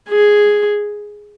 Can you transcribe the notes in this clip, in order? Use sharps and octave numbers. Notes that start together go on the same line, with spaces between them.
G#4